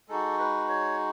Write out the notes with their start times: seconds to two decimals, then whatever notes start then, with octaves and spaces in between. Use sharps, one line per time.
0.09 G#3 D#4 F#4 A4
0.39 B4
0.69 C#5